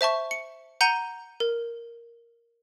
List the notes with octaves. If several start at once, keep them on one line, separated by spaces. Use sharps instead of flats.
C5 E5 A5 C#6
C#7
F#5 A#5 G6 C#7 D#7 G7
A#4